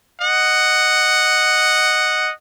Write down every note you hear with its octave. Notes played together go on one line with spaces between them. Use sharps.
D#5 F#5